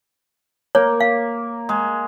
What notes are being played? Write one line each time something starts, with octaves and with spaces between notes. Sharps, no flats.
A#3 C#5
F5
G#3